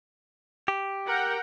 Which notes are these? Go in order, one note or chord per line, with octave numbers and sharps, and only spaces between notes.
G4
A#4 F#5 G5